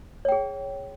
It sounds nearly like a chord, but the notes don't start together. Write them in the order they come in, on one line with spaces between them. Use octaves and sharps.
C#5 G5 G#4